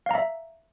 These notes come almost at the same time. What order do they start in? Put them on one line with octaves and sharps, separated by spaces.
F5 A#5 E5